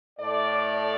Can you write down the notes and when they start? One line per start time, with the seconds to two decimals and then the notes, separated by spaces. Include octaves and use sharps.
0.19 A2 A3 A4 D5